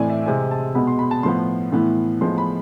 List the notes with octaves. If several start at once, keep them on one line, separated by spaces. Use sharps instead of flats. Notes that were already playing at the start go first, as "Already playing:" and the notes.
Already playing: A2 E3 A3 C4 D5 G#5
E5
C3 G#3 C4 G#5
A5
B2 G#3 B3 B5
C6
B5
A5
A2 F3 B3 C6
A2 E3 B3
A2 F3 G#3 B3 C6
B5